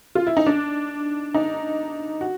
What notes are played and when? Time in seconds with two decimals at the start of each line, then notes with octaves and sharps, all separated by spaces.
0.15 F4
0.27 E4
0.37 D#4
0.46 D4
1.34 D#4
2.21 F#4